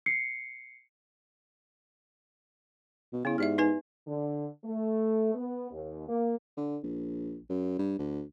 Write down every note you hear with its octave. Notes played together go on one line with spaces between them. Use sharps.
C7 C#7
B2
C#3 B3 E4
G#2 G4 D5 E5
D#4 B4 G#5
D3
A3
B3
D#2
A#3
D3
A#1
F#2
G2
D2